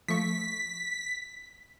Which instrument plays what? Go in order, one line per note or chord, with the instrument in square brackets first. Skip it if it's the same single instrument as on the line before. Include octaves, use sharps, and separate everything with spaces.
[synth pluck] F3 A3 C#6 [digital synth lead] B6